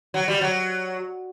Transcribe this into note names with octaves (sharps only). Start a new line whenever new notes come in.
F#3
G3
F#3